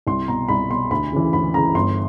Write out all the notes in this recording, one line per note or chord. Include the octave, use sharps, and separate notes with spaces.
C2 C6
B2 A#5
C2 B5
B2 C6
D2 B5
C#3 E3
D2 B5
C#3 E3 A#5
G1 C6